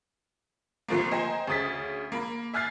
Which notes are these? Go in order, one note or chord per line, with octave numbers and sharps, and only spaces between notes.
C2 D3 F3 A3 A#3
C5 D#5 G5 G#5 A#5 C6
D2 C#3 D#6 A6 B6
A#3 B5
E5 G#5 F6 F#6 A6 C7